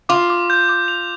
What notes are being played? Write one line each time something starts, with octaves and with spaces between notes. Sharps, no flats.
F4 D6
D6
G6
D6
F7